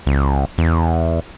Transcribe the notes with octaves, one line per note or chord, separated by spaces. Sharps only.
C#2
E2